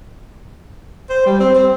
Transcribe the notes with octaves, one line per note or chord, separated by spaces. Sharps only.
C5
G3
C4
C4